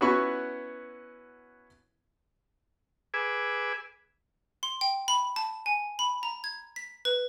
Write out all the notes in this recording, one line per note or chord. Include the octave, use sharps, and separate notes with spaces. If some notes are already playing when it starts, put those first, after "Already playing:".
B3 C#4 E4 F#4 B5 C#6
G#4 B4 G#5 D6 E6
C6
G5
B5
A5
G#5
B5
A#5
G#6
B6
B4